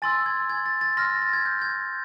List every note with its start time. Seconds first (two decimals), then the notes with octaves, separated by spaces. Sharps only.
0.02 G#5 C6 E6 A6
0.26 G#6
0.50 G#6
0.66 A6
0.81 A6
0.97 C6 F6 A#6
1.10 A#6
1.22 A6
1.33 G#6
1.46 G6
1.62 G#6